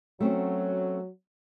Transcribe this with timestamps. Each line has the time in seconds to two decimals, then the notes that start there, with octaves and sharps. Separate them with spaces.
0.21 F#3 A3 C4 C#4